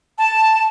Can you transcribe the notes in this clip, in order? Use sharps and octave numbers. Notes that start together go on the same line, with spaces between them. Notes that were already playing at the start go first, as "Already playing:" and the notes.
A5